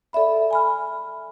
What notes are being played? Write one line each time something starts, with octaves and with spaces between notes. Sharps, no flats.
A4 D5 E5 B5
G#5 B5 F6